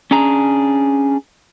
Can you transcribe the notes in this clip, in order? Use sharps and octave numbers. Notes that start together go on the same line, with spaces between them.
C#4 D4 G#4 A#5